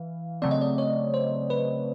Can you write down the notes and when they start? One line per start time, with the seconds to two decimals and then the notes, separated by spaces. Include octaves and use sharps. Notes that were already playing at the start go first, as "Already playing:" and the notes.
Already playing: E3 F5
0.42 C#3 F#3 A3 C4 D5
0.51 D#5
0.61 D5
0.78 C#5
1.14 C5
1.50 B4